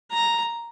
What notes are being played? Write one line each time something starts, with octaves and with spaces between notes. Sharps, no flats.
A#5